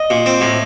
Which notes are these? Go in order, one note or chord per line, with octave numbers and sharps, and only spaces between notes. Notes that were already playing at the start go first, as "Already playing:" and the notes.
Already playing: D#5
A#2
C4
A2